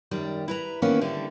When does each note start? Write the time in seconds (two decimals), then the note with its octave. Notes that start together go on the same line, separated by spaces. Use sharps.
0.11 F#2 D#3 G3 D5
0.48 E4 B4 A#5
0.82 D#3 E3 A#3 B3 C#4 E4
1.01 D3 G3 E4 A4